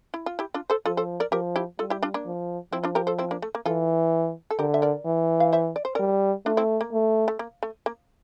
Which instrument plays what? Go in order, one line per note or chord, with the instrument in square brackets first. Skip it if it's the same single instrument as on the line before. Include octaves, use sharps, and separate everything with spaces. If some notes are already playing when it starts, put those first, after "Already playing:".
[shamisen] E4
F4
E4 G4
D4 F4
A4 C5
[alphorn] F3 [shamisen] F4 A4
[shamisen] A4 C5
A#4 D5
[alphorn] F3 [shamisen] G4 A#4
[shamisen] E4 G4
[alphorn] G3 [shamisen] F4 A4
[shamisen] E4 G4
D4 F4
A#3 D4
[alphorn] F3
[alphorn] F3 [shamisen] C4 E4
[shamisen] D4 F4
G4 A#4
A4 C5
C4 E4
A#3 D4
A3
A#3
[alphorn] E3 [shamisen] F4 A4
[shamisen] A4
[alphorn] D3 [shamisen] G4 A#4
[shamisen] E5
A#4 D5
[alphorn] E3
[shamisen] F5
C5 E5
D5
C5
[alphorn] G3 [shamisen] A#4 D5
[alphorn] A3 [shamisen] D4 F4
[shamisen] C4 E4
A#3
[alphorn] A3
[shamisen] A3
A#3
A3
A#3